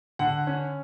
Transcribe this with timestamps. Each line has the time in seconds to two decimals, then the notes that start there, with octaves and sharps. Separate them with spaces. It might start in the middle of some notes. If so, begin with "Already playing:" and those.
0.19 D3 F#5
0.47 C#4